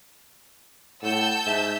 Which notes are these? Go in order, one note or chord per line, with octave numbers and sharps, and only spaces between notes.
A2 F#5 A5 E6 G6
G#2 E5